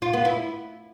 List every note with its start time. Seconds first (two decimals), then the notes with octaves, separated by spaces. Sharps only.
0.02 F4
0.13 B3
0.25 E4